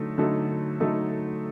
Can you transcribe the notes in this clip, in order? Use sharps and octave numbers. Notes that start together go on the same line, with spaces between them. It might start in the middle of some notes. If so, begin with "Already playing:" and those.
Already playing: D3 F#3 A3 D#4 A4
D3 F#3 A3 D#4 A4
D3 F#3 A3 D#4 A4